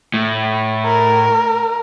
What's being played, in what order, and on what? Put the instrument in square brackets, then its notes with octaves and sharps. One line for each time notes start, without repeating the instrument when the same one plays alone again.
[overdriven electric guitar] A2
[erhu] A#4